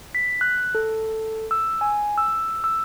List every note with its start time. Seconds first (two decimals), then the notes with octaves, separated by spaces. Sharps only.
0.15 B6
0.41 F#6
0.75 A4
1.51 E6
1.81 G#5
2.18 E6
2.64 E6